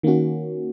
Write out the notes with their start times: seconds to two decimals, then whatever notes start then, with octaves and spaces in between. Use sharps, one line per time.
0.03 D#3 A#3 C#4 F#4